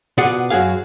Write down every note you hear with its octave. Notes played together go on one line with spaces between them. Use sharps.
B2 F4 G#4 B4 D5 F#5
F#2 F#4 G#4 F5